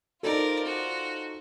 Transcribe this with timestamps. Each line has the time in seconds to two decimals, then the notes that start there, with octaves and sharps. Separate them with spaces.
0.23 D#4 F4 A4 A#4 C5 D5
0.65 F#4